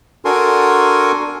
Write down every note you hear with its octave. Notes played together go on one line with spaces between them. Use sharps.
D4 F#4 A4 A#4 G#5 C6